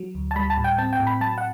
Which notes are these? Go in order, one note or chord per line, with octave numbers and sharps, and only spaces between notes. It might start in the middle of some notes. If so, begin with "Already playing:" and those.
Already playing: F#3
D2
A5
G3 B5
A5
A2
G5
C4 A5
G5
A2
B5
F#3 A5
F#5